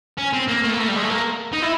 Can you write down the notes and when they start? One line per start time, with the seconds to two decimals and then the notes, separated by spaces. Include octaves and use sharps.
0.18 C#4
0.33 C4
0.49 A#3
0.64 A3
0.73 A#3
0.79 A3
0.89 G3
0.96 G#3
1.03 A3
1.10 A#3
1.53 D#4
1.62 E4